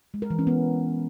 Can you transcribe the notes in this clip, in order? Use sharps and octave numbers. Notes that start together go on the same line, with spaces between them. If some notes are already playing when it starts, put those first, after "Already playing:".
G#3
A#4
E3
C#4
B3